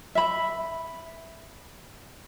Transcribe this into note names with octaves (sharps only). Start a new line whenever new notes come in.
E5 B5